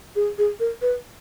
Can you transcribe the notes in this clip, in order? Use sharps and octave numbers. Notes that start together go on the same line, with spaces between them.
G#4
G#4
A#4
B4